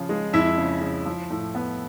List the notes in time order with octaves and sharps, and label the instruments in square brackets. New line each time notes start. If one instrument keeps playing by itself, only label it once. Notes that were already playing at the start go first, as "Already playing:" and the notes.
Already playing: [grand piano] C#3 F3
G#3
F2 E4 E5
C#3
C#3
F3
A2
B3